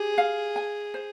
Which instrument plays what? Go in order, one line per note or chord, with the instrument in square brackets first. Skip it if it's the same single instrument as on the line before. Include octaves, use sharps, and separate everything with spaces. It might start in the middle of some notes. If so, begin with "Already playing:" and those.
Already playing: [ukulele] G4 [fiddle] G#4
[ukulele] F5
G#5
C5